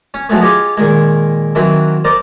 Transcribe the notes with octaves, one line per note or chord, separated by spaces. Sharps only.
C#4
F3 F#3 G#3 A3 B3
F4 G4 G#4 C#5 D#5
A#2 D#3 G#3
D#3 E3 F#3 C4
A#4 C5 D5 D#5